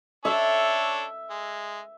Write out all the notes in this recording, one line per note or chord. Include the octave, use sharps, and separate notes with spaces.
D4 A4 C#5 E5
G#3